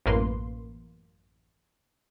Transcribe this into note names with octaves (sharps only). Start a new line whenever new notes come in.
A1 F#2 A#3 B4 C6